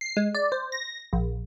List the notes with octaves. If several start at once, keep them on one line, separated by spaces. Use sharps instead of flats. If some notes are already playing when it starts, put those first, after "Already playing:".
C7
G#3
D5
C5
A#6
A#1